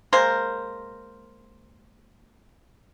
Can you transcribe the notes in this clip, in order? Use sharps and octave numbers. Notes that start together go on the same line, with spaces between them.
G#3 A#3 A#4 C5